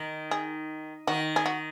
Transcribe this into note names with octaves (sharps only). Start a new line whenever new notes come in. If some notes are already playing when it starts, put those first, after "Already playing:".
Already playing: D#3
G#4
D#3 F#4
G#4
F#4